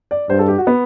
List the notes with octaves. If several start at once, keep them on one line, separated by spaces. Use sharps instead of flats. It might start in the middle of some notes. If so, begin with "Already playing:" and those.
D5
G2 C5
A4
G4
F#4
B3